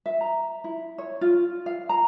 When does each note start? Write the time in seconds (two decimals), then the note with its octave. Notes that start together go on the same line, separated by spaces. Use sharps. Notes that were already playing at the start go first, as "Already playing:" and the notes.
0.06 E5
0.21 A#5
0.64 E4
0.98 C#5
1.21 F4
1.66 F5
1.89 A#5